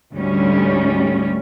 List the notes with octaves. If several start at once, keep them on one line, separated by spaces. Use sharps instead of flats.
D2 G#2 G3 C#4